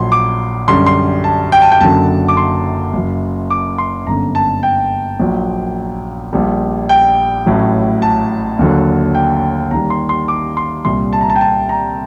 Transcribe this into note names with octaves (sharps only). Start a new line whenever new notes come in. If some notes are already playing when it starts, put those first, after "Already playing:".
Already playing: A#1 A#2 F#3 C6
D6
F#2 D3 G3 C6
C6
A5
G5
A5
G5
F#1 F#2 D3 F#3 A5
D6
C6
F#1 F#2 F#3
D6
C6
G1 F#2 D3 A#5
A5
G5
A#1 A#2 F#3
A#1 A#2 G3
G5
A1 A2 F#3
A5
D#2 D3 F#3
G5
D#2 D#3 G3 A#5
C6
C6
D6
C6
C2 A#2 G3 C6
A5
A#5
A5
G5
A5
A#5